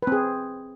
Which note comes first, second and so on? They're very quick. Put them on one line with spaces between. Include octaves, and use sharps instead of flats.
B4 C4 G#4